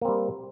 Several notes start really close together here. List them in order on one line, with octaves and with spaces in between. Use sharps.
A#3 C4 G3